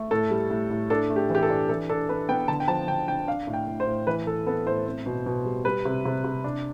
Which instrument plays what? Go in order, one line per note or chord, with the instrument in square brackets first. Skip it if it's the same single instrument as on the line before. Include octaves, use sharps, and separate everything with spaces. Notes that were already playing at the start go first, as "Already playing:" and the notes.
Already playing: [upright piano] A3
A2 A4
G3
A2
A2
D4 A4
A3
G4
E3 G4
A4
D4
E3 A4
D4 A4
D4 B4
B3 G5
D3 A5
G5
F3 A5
D3 G5
D3 G5
D4 F5
A2
G5
A2
C5
A2
E3 B4
E3 A4
B3 A4
A2 C5
C4
B2
B2
G3
G3 B4
C3
C3
C3
D4